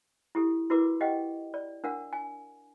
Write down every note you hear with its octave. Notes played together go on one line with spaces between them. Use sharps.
E4 G4 A4
E4 F#4 A#4 B4 D6
G4 D#5 F#5 G5
D5
D4 A#4 F#5
G#5